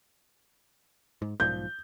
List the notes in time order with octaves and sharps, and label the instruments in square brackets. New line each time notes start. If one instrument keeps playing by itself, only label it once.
[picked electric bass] G#2
[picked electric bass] B1 G#2 F3 [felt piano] G6